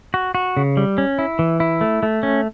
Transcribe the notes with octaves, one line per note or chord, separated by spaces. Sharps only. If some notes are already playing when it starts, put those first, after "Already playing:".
F#4
F#4
C#3
G3
C#4
E4
E3
E4
A3
A3
C#4